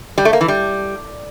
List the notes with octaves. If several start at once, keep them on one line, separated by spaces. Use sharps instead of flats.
G3
A3
A#3
E3
G3